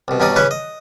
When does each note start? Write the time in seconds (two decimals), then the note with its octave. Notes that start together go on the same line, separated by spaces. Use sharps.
0.08 C2 B2
0.20 G2 B2 C#4 D#4 D5 D#6
0.36 C#3 E3 C#4 B4 C#5 D6
0.51 D#5